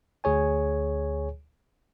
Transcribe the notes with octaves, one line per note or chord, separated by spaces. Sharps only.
D2 G#4 C#5 G#5